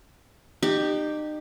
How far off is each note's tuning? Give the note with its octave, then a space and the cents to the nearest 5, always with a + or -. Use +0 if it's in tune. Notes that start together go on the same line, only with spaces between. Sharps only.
D#4 -35 G4 +0